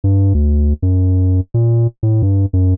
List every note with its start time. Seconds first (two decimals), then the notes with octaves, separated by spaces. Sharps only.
0.04 G2
0.34 D2
0.82 F#2
1.54 A#2
2.03 A2
2.22 G2
2.53 F#2